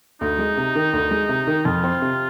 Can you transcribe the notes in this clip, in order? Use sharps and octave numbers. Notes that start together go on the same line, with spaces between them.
D2 D#4
G#3
C3
D#3
D2
G#3
C3
D#3
F2 F4
C4
C3